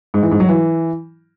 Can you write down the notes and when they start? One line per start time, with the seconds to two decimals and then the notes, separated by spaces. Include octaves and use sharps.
0.14 G#2
0.23 E3
0.31 G#2
0.40 F#3
0.49 E3